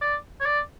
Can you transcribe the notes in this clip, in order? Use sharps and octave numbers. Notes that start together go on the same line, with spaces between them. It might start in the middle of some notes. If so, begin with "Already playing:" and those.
D5
C#5
D5